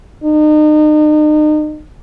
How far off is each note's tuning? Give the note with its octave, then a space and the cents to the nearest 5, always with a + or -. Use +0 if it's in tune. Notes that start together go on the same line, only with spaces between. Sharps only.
D#4 -35